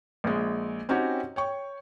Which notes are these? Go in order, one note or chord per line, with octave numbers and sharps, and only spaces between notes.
A#1 G#3
C4 C#4 D#4 F#4 G4 C#5
C#5 G5 C#6